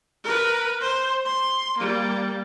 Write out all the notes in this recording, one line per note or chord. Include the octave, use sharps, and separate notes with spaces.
A#4 B4
C5
C6
G3 A#3